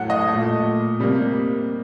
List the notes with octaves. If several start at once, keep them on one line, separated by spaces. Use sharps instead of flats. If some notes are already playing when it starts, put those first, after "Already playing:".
Already playing: A2 F#3 A3 F#5
D#5
A3
A#2
C3 G3 A#3